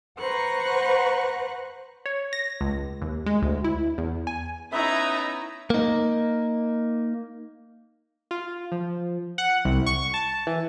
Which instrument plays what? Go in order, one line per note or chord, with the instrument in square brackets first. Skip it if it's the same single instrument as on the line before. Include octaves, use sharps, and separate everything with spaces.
[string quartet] B4 C5 F#5 A#5 C#6 F#6
[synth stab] C#5
A#6
C#2
D#2
G#3
D2
E4
E2
G#5
[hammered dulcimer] B3 [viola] C#4 E4 [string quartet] D#4 A#5 [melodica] E5
[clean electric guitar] A#3 D#4
[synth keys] F4
F3
F#5
C2
C#6
A5
E3